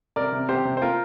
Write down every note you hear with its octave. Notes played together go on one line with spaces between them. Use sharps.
C3 A#4 D5
C3
C3 G4 C5
C3
C5
A#3 F4 A#4